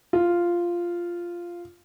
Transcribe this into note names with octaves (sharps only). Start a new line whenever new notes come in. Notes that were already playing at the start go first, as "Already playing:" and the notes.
F4